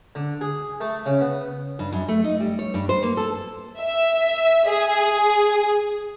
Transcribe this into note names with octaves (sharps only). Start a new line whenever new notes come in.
D3
G#4
A3
C#3
B3
G2
F#2
A3
D#4
G3
C#5
G2
C5
A#3
A4
E5
G#4